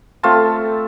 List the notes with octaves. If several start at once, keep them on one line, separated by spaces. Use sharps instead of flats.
A3 C4 F4 A5